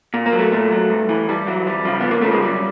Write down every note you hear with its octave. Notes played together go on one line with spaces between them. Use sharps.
A#2
A#3
F#3
A3
A#2 A3
F#3
G2
E3
G2 G3
E3 F#3
F2 G3
C#3 F3
F2 B3
A#3
C#3 F3 A3
G#3
F#2 G3